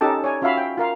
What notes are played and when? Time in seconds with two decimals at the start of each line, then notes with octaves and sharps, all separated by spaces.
0.01 C#4 D#4 G4 A4 A5
0.24 C#5 D5 G#5
0.42 C#4 F4 F#4 E5 F5 B5
0.57 G5
0.78 F4 A#4 F5